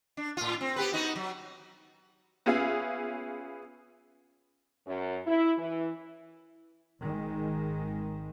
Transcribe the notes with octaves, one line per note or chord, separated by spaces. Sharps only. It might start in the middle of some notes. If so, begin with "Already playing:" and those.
D4
A2 F4
C4
B3 G4 B4
B3 D#4 F#4
F#3
B3 C#4 F4 G#4 E5 F5
F#2
E4
E3
G#1 D#3 G#3